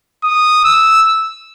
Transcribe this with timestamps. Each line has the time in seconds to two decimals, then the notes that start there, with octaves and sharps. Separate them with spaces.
0.24 D#6
0.65 E6